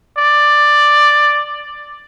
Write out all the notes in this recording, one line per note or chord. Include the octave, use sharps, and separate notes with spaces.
D5